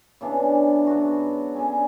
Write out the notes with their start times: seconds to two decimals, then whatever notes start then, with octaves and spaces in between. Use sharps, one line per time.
0.21 C#3 E3 B3 D4
0.87 G#2 F#3 B3 F#4
1.54 D3 F#3 C#4 G#4